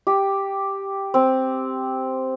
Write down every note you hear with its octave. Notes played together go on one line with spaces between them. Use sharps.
G4
C4